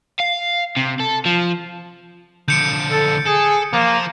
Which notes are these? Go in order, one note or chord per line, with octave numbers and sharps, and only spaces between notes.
F5
C3
A4
F3
D3 F3 G6 C#7 D7
A4
G#4 A4
F3 A#3 F4